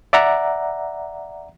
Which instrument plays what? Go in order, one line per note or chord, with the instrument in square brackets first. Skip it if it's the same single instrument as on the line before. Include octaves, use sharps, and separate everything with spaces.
[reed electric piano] D5 E5 F#5 A#5